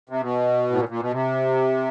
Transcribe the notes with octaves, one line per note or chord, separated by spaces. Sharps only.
C3
B2
A2
A#2
A#2
B2
C3